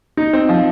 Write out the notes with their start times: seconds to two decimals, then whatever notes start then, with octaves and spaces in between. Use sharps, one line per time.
0.17 D#4
0.33 C4
0.49 F3